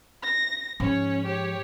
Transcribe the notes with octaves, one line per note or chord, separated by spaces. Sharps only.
A#6
G#2 F3 C#4 C#5
G4 C#5